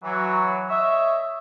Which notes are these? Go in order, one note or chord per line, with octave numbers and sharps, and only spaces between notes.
E3 F#3
C#5 D#5 E5